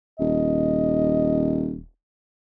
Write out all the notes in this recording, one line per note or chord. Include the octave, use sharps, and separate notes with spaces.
D#1 D#5